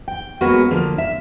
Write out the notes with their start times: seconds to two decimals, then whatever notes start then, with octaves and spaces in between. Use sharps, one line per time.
0.08 G5
0.41 G#3 A#3 B3 C#4 F#4 G#4
0.71 D3 F3 A#3
0.98 E5